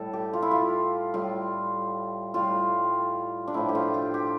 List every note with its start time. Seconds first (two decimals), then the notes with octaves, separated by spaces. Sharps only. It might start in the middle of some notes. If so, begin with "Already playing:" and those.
Already playing: A2 G3 A4
0.13 G4
0.33 F4
0.42 E4
0.51 F4
1.14 A2 G3 F4
2.34 A2 G3 F4
3.48 D4
3.54 A2 F3 A3 E4
3.69 G4
3.75 F4
3.94 G4
4.14 G4